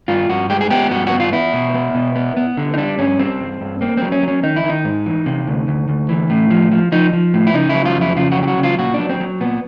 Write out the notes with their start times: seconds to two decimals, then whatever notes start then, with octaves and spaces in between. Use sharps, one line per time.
0.08 G2 F4
0.29 G2 F#4
0.50 G#3 G4
0.61 G#4
0.70 B3 G4
0.91 G2 F#4
1.07 F#4
1.12 B3
1.20 F4
1.32 B3 E4
1.53 B2
1.74 B3
1.95 B2
2.16 B3
2.37 B3
2.57 D3
2.74 D#4
2.78 G3 D4
2.98 G2 C#4
3.19 G3 C4
3.40 G2
3.61 G2
3.81 A#3 C4
3.97 F#3 C4
4.12 C#4
4.23 F#3
4.28 C#4
4.43 D#3 D#4
4.56 E4
4.64 D#3
4.70 D#4
4.85 G#2
5.06 E3
5.26 C3
5.47 D2
5.68 D2
5.89 D2
6.09 E3
6.30 A2
6.51 F3
6.72 F3
6.92 F3 D#4
7.13 F3
7.34 A2
7.47 E4
7.54 C#3 D#4
7.70 F#3 E4
7.86 F4
7.96 F2
8.01 E4
8.16 C#3 F4
8.32 F#4
8.37 F#3
8.43 G4
8.48 F#4
8.57 C#3
8.63 F4
8.79 A#2 F#4
8.94 F#3 D4
9.09 C4
9.20 F#3
9.41 A#2 B3